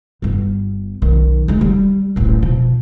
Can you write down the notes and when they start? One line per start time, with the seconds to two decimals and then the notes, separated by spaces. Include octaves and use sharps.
0.22 G1 B3
1.02 B1 D#3
1.48 D2 G#3
1.61 G3
2.16 D1 A1
2.42 B2 F3